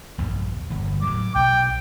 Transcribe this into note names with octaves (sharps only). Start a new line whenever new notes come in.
A#1 E2 G2
G1 E2
A2 F#3 D6
B1 G5